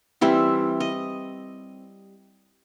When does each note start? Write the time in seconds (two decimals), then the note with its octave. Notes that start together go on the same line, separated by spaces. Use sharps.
0.21 E3 G3 C4 E5
0.80 D#5